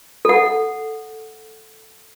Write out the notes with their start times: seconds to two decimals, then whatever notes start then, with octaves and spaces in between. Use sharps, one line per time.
0.25 A4 F#5